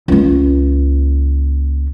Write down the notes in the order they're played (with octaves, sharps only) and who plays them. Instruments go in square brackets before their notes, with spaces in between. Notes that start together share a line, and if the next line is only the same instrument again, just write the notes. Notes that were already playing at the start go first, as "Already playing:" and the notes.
[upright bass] C#2 A#3